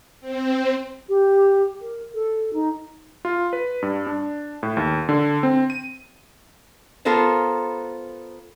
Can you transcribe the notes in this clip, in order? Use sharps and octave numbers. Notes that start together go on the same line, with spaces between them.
C4
G4
A#4
A4
D#4
F4
B4
G2
D4
A2
D#2
D3
C4
D#7
B3 F4 A4 A#4 C5